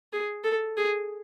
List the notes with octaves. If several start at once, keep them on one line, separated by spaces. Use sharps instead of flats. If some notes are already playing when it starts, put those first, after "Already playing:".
G#4
A4
G#4